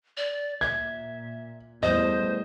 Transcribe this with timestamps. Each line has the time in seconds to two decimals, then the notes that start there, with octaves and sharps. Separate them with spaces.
0.17 D5
0.61 A#2 E5 G#6
1.83 E2 G3 A3 C5 D#5